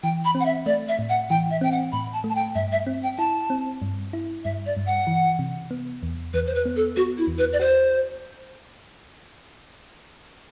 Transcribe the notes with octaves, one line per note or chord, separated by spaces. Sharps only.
E3 G5
B5
C4
F#5
E5
A3 D5
E5
A2
F#5
E3 G5
E5
C4 G5
F#5
A2 B5
A5
A3
A5
G5
G2 E5
E5
C4
G5
E4 A5
C4
G2
E4
G2 E5
D5
G2
F#5
E3
C3
B3
E2
E2 B4
C5
B4
B3
A4
B3 F#4
E4
E2
B4
D5
F#4 C5